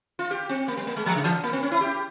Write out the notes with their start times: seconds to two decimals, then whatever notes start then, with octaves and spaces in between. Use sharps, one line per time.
0.19 F4
0.31 G4
0.49 C4
0.68 A#3
0.77 G3
0.87 A#3
0.97 G#3
1.06 F3
1.16 C#3
1.24 E3
1.44 A#3
1.53 C4
1.63 C#4
1.72 E4
1.81 G4